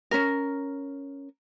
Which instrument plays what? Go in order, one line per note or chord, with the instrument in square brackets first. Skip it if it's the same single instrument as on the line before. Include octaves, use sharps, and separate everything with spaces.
[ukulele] C#4 A#4